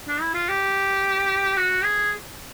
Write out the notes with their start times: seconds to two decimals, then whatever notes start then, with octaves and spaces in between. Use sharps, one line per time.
0.08 D4
0.21 E4
0.34 F4
0.49 G4
1.57 F#4
1.84 G#4